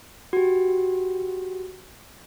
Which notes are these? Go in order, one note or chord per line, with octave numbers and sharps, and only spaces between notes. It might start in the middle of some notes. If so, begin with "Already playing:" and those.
F#4 G4